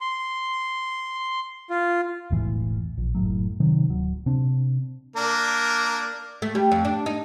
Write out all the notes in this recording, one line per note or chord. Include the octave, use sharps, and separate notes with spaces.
C6
F4
E1 B1 A2 E3
A#1
F#1 C2 A2 F#3
C3 D#3 F#3
D1 F#3
C3 C4 D4
A#3 D4 A#4
A3
G3
F2
D4
D#4